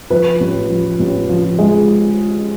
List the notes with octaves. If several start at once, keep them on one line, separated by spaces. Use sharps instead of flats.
F3 B4
A1
F3
A1
F3
G#3